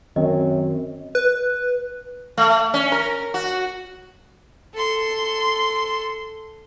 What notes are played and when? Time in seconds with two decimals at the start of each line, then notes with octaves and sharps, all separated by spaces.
0.16 F#2 D#3 C4 D#5
1.15 B4
2.37 A3
2.74 C#4
2.92 A#4
3.34 F#4
4.74 A4 C6